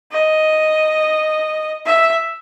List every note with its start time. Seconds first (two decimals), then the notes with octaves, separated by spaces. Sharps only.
0.12 D#5
1.85 E5